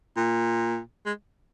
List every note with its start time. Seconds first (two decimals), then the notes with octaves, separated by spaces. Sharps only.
0.17 A#2
1.06 G#3